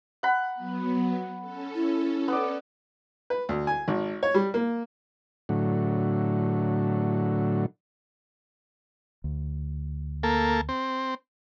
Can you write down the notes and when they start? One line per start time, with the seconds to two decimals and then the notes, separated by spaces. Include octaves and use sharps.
0.23 F#5 B5
0.55 F#3 B3
1.41 C#4 A4
1.75 E4
2.28 B3 D5
3.30 B4
3.49 D2
3.67 G#5
3.88 G#1
4.23 C#5
4.34 G3
4.54 A#3
5.49 A2 D3 F#3
9.24 D2
10.23 A#3 A4
10.69 C4